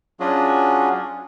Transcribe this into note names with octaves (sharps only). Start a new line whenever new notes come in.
F#3 C#4 D4 F4 F#4 G#4